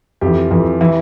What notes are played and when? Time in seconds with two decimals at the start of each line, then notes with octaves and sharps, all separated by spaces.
0.21 F2 E3 G4
0.51 F2 E3
0.81 E3